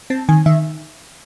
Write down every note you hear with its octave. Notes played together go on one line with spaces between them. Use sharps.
C4 A5
D#3 G#5
D#3 E5